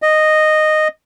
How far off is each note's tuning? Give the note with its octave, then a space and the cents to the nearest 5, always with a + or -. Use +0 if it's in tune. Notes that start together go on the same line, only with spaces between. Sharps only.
D#5 -10